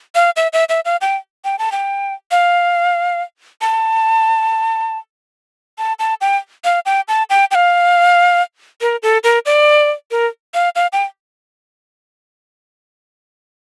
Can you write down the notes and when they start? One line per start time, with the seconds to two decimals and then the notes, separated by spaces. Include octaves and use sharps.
0.15 F5
0.36 E5
0.53 E5
0.69 E5
0.85 F5
1.01 G5
1.45 G5
1.59 A5
1.72 G5
2.31 F5
3.61 A5
5.78 A5
5.99 A5
6.21 G5
6.64 F5
6.86 G5
7.08 A5
7.30 G5
7.51 G5
7.55 F5
8.81 A#4
9.03 A4
9.24 A#4
9.46 D5
10.11 A#4
10.54 F5
10.76 F5
10.93 G5